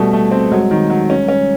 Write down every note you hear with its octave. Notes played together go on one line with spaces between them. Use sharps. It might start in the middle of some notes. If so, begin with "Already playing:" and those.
Already playing: B2 G3 A3
A3
C4
F#3 G#3
D#3
F#3
C#4
C#4